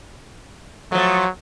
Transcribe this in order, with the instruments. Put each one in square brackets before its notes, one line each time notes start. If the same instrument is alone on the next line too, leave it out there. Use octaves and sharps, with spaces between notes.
[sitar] F3 A3 [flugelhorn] F#3